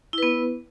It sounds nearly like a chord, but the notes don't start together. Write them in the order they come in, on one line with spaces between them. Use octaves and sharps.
E4 B4 B3